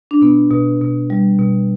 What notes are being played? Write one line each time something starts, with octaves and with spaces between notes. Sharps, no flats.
D4
B2 B3
B2
B2
G3
B2